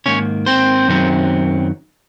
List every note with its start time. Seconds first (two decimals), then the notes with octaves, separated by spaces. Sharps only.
0.06 G#2 D#3 A#3 C#4 C#5
0.46 C4 C5
0.88 F#2 D#3 F#3 C4